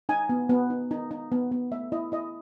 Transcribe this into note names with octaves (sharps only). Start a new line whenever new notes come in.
D#4 G#5
B3
B3
D#4
D#4
D#4
B3
B3
A3 E5
E4 D#5
E4 D#5